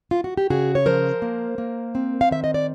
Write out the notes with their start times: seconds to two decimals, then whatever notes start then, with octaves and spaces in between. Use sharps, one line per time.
0.11 F4
0.24 F#4
0.37 G4
0.50 C#3 F#4 G#4
0.75 C#5
0.86 F3 A#4 C5
1.22 A#3
1.58 A#3
1.95 C4
2.21 F5
2.31 D#3 E5
2.44 D#5
2.54 D5